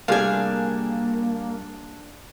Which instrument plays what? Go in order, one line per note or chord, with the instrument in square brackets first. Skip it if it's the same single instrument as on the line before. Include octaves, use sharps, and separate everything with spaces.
[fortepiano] C3 A3 G#4 [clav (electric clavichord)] G3 F5 [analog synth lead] A#3 [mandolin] D4 G#5